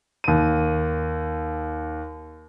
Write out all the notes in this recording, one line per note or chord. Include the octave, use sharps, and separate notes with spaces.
D#2 D#7